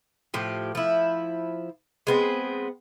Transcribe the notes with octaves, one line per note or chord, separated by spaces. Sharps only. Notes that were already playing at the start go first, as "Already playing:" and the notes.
A2 F3 G4
F3 E4
G#3 B3 C4